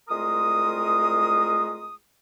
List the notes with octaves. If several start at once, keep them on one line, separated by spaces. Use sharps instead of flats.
C2 G#3 A3 F4 A#4 D#6